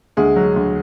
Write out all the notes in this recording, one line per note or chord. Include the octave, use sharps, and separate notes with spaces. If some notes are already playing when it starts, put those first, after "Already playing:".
D2 G#3 G#4
F#3
D2